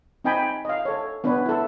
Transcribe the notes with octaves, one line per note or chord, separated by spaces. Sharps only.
C4 D#4 D#5 G5 G#5 B5
D#5 F5
A4 C#5
B3 D4 B4 C#5
E4 A4